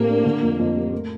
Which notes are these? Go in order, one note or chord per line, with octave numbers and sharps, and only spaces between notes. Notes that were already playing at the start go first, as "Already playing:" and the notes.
Already playing: A2 A3 A#3 C4 G4
D4
D3
F2
F2
G3
A3